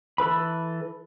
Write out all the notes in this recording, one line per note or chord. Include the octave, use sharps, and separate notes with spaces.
E3 A4 B4 B5